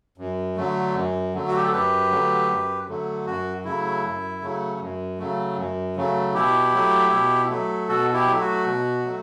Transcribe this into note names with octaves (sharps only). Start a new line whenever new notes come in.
F#2
D3 F#3 A3
F#2
D3 F#3 A3
F#4
G4
A4
F#2 G4 B4
D3 F#3 A3
F#2
D3 F#3 A3
F#2 F#4
C#3 F#3 A3 E4
F#2
C#3 F#3 A3
F#2
C#3 F#3 A3
F#2
C#3 F#3 A3
B2 E4 G4
F#3 A3
B2
F#3 A3
B2 F#4 A4
E4 G4
F#3 A3
F#4
B2
F#3 A3